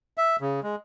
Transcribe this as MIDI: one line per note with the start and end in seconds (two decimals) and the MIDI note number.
0.18 0.36 76
0.41 0.60 49
0.63 0.75 56